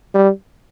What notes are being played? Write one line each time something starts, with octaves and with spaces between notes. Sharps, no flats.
G3